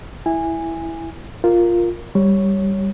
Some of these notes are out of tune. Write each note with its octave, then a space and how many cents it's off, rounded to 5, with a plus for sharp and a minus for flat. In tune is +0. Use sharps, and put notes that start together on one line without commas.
E4 +0 G#5 -15
F4 +0 A#4 +0
G3 +0 C#5 +0